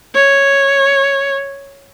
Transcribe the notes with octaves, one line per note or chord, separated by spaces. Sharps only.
C#5